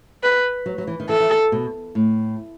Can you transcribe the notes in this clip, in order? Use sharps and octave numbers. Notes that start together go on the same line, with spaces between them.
B4
F#3
F#3
E3
D#3
E3 A4
E3
D#3
B2
A2